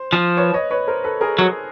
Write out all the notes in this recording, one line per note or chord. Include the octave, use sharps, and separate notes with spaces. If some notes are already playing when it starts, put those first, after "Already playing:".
Already playing: C5
F3
B4 C#5
C#5 D#5
B4 C#5
A#4 C5
A4 B4
G#4 A#4
F#3